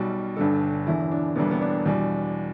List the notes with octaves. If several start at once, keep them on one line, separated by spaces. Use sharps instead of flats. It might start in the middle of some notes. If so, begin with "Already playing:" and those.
Already playing: B1 B2 G3
G1 G2 D3 G3 A4
E1 E2 D3 E4
D4
E1 D2 D3 G3 B3
B3
D4
E2 B2 G3